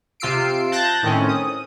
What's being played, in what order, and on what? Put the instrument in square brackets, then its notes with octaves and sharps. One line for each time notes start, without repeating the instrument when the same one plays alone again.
[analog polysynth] C3 F4 E6 C7 D7
A5 F#6 G6 A6 A#6
A2 D#3 C4 C#4
D#6